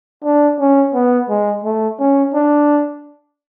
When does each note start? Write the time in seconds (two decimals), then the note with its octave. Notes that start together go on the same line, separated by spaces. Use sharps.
0.24 D4
0.59 C#4
0.94 B3
1.29 G#3
1.64 A3
1.99 C#4
2.34 D4